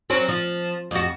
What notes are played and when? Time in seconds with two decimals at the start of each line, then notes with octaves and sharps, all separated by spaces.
0.10 F#3 C4 C#4
0.28 F3
0.91 F2 F#4